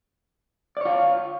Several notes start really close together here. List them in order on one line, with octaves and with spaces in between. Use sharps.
D5 C#5 F4